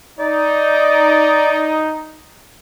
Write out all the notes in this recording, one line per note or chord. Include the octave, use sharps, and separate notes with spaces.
D#4 D5